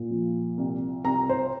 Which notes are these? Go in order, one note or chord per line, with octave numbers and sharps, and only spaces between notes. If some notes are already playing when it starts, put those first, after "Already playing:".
Already playing: A#2
F3
C2
C2 A#5
C5